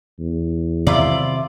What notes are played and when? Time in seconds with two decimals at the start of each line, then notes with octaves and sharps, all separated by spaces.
0.20 E2
0.87 C3 D#3 F#3 E4 F4 D5